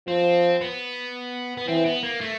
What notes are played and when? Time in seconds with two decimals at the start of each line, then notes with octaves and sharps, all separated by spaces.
0.08 F3 C4
0.61 B3
1.57 B3
1.68 E3 C4
1.85 B3
2.03 A#3
2.21 A3